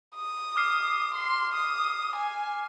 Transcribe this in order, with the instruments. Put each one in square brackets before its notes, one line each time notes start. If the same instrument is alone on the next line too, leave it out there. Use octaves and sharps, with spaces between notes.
[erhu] D#6
[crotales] D6 F6 C7
[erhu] C6
D#6
G#5